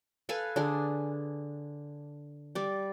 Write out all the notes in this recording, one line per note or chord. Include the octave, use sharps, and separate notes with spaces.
A4 B4 F5 G#5
D3 D4 G#4
G3 D5